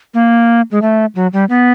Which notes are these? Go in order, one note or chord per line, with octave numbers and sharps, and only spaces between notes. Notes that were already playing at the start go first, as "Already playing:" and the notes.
A#3
G#3
A3
F#3
G3
B3